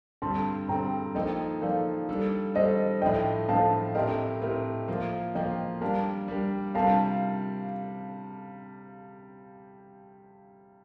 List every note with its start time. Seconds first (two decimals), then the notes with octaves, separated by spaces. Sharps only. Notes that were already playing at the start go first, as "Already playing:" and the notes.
0.22 G2 D3 G3 C4 A5 C6
0.68 G2 D3 G3 C4 G5 A#5
1.15 F3 A#3 D#4 A4 D#5 G5
1.62 F3 A#3 D#4 A4 D5 F5
2.09 G3 D4 A4
2.54 G3 D4 A4 C5 D#5
3.02 A2 F3 A3 D4 D#5 G5
3.49 A2 F3 A3 D4 F5 A5
3.95 A2 A3 C4 G4 A#4 D#5 G5
4.41 A2 A3 C4 G4 A#4
4.88 F3 A#3 F4
5.35 F3 A#3 F4 D#5 G5
5.81 G3 D4 G4 A#4 F5 A5
6.28 G3 D4 G4 A#4
6.75 C3 G3 D4 F4 A#4 F5 A5